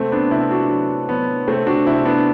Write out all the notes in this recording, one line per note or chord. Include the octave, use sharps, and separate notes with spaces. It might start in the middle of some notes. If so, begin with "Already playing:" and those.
Already playing: C3 A3 C4
B3 D4
C3 C4 E4
D4 F#4
F#3
F#3 B3
C3 A3 C4
D4 F#4
C3 C4 E4
B3 D4